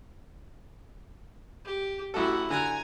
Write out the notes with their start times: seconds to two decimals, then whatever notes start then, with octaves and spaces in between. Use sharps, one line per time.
1.65 G4
2.14 A1 E4 F#4 A4
2.50 D3 G#5 A#5 F#6